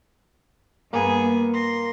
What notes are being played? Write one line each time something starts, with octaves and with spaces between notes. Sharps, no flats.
G2 A#3 B3 G#4
C6 A#6